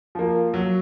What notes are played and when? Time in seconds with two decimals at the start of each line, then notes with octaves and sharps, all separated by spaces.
0.15 F3 A#3
0.54 F#3